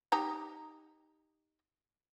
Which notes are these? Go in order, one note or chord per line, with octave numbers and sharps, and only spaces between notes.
D#4 G4 A#5